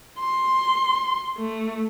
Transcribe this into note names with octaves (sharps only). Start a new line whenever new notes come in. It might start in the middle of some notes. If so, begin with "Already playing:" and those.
C6
A3